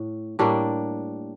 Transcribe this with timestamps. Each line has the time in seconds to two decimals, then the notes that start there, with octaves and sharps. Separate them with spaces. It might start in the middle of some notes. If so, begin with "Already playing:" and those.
Already playing: A2
0.39 A2 G3 A#3 D4